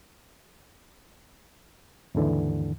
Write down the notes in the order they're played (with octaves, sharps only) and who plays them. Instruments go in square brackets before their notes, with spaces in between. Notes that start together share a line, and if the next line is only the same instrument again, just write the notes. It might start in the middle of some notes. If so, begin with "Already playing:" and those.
[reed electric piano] D#2 G#2 D3 E3